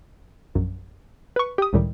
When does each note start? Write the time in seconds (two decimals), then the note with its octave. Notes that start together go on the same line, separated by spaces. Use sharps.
0.55 A#1 F#2
1.36 B4 C#6
1.58 G4 D#6
1.73 C#2 A2 D#3 G3